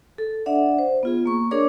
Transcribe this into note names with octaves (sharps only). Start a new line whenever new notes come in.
A4
D4 D5 E5 F#5
C5
B3 F4 G#4
A#3 C#6
D4 G#4 A#4 C#5 D5 D6